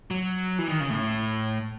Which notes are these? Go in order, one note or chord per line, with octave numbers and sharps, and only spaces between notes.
F#3
E3
D#3
C#3
A2